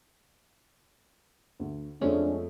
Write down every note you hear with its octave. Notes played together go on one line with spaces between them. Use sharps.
D2
F2 F3 G#3 A3 C#4 D4